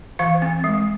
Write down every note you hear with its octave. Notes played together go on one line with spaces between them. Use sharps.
E3 F5
C4
G#3